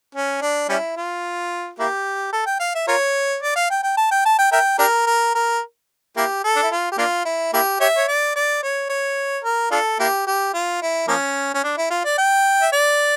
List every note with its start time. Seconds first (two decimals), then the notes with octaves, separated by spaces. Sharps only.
0.15 C#4
0.42 D4
0.69 G3 C#4 E4
0.97 F4
1.79 A#3 E4 G4
2.33 A4
2.47 G5
2.60 F5
2.75 E5
2.88 F4 A#4 C#5
3.43 D5
3.56 F5
3.71 G5
3.83 G5
3.97 A5
4.11 G5
4.25 A5
4.39 G5
4.52 A#4 E5 G5
4.79 D4 G4 A#4
5.07 A#4
5.35 A#4
6.17 A#3 E4 G4
6.44 A4
6.56 D4
6.63 E4
6.72 F4
6.92 G4
6.98 A#3 D4 F4
7.25 E4
7.54 A#3 E4 G4
7.80 G4 C#5 E5
7.97 C#5
8.08 D5
8.36 D5
8.63 C#5
8.89 C#5
9.44 A#4
9.71 D4 F4 A4
9.99 A#3 E4 G4
10.27 G4
10.54 F4
10.82 E4
11.08 F3 A#3 C#4
11.54 C#4
11.64 D4
11.77 E4
11.90 F4
12.05 D5
12.18 G5
12.61 E5
12.73 D5